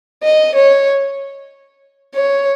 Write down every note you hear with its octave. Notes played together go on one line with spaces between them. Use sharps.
D#5
C#5
C#5